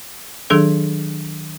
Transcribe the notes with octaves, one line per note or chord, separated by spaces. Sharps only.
D#3 F#3 D4 G#4 A4